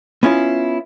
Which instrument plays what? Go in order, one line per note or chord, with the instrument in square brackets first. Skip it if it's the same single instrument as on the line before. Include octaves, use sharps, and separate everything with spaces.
[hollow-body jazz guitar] B3 C#4 E4 F4